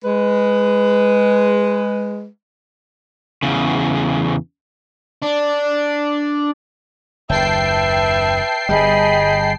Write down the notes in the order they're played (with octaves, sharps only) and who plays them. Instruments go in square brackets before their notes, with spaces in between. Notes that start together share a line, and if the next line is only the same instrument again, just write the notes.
[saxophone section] G#3 B4
[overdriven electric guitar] E2 C#3
D4
[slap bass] F#1 D#2 [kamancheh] B4 E5 [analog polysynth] G5 A5 C7
[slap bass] G1 G3 [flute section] G#4 D#5 B5